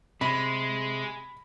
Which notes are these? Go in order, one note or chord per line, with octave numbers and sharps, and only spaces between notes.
C3 G#3 B5